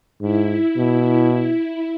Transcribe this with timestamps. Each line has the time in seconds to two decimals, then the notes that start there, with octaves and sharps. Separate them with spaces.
0.21 G#2 E4
0.77 B2
1.31 E4